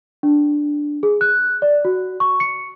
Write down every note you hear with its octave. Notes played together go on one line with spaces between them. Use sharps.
D4
G#4
F#6
D5
F#4
C#6
C#7